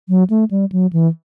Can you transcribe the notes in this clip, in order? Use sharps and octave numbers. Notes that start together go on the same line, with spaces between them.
F#3
A3
G3
F#3
E3